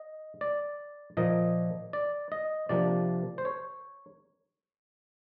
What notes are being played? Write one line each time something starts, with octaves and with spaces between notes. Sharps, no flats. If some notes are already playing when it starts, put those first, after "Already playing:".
Already playing: D#5
D5
A#2 F3 A#3 D#5
D5
D#5
C3 F3 A#3 D4 D5
C5
C#5